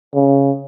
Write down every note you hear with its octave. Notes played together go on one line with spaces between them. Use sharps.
C#3